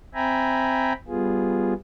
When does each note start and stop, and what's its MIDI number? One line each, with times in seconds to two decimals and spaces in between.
0.14 0.93 60
0.14 0.93 76
0.14 0.93 79
0.14 0.93 80
0.14 0.93 82
0.14 0.93 83
1.08 1.74 55
1.08 1.74 59
1.08 1.74 65
1.08 1.74 68